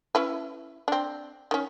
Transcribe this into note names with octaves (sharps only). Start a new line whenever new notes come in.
C#4 E4 B4
C4 D4
D#3 C#4